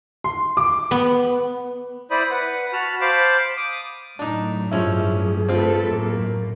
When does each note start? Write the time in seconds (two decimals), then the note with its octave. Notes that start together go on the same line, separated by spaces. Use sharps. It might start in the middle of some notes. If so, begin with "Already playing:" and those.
0.24 C6
0.57 D6
0.91 B3
2.11 E4 C5 D5 B5 D#6
2.31 B4 F#5
2.73 F#4 A5 B5 F6
3.01 C5 F5 A5 B5 C6 D6
3.57 D6 D#6
4.19 F#2 A2 D4 D#4
4.71 G2 F3 C#4 E4 G#4
5.49 A2 C4 F4 A4 B4
5.86 F#2 A2 A#3